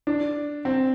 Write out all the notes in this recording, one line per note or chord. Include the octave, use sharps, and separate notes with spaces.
D4
C4